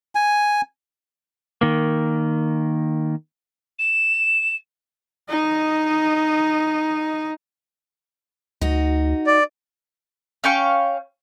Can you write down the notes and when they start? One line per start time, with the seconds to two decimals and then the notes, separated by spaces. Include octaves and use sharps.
0.15 G#5
1.61 D#3 A#3
3.79 E7
5.30 D#4 D#5
8.61 D2 D#4 F#4
9.27 D5
10.44 C#4 F5 G5 C#6